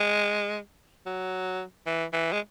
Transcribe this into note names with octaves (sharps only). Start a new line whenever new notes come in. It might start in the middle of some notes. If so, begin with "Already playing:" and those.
Already playing: G#3
F#3
E3
E3
G#3